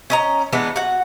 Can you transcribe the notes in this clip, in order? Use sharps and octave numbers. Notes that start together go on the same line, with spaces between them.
C#4 D#5 A#5
E3 G#3 B3 D4
F#4 F#5